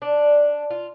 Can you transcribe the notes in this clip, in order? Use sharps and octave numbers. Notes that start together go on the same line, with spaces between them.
D4
F4